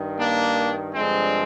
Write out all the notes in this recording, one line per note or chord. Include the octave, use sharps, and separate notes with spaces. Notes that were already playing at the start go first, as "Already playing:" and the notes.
Already playing: G2 D#3
A#3 D4
G2 D3 F3 G#3 C4